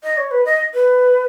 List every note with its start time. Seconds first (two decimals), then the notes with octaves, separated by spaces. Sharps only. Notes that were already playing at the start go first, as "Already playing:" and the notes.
0.04 D#5
0.18 C#5
0.31 B4
0.46 D#5
0.74 B4